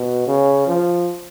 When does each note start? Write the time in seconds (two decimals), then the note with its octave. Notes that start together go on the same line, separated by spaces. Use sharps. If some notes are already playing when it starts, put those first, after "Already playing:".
Already playing: B2
0.27 C#3
0.67 F3